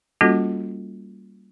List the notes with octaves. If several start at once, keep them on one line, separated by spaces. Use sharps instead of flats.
G3 A#3 C#4 F4 F#4 A4